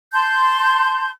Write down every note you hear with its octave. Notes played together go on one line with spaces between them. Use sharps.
A5 C6 G6